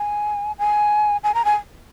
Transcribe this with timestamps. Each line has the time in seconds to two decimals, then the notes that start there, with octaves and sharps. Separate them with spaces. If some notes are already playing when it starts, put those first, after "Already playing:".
Already playing: G#5
0.59 G#5
1.24 G#5
1.35 A#5
1.45 G#5